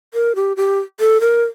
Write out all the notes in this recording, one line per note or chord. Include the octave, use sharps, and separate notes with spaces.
A#4
G4
G4
A4
A#4